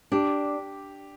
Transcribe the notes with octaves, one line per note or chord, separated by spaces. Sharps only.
D4 G4